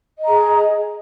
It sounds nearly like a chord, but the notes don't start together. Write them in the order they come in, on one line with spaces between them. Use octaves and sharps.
D#5 A#5 G#4